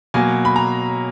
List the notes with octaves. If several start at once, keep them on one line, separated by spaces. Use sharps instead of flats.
B2 F#3 A#3 G#5
B5
A#5